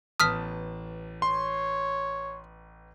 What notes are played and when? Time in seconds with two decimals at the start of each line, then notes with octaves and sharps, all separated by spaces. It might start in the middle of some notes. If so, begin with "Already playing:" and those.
0.20 A1 B3 A5 D#6 F6 B6
1.22 C#5 C6